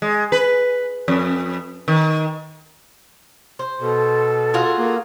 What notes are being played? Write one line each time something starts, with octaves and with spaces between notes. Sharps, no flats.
G#3
B4
F2
D#3
C5
B2 A4
F4 F#4 G#4
A#3